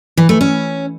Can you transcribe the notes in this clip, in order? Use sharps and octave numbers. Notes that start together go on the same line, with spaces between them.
E3
A3
C#4